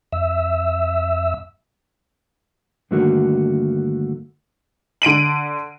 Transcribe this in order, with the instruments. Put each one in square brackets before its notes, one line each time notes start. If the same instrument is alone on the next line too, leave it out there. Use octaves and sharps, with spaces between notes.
[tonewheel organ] F2 E5 E6
[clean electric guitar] G2 D3 D#3 A3 A#3 F#4
[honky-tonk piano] D3 D7 D#7 F#7